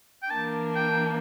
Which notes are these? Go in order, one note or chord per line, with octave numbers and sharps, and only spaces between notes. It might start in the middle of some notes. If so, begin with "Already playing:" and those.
G5
E3 A#3 D4 A5
G5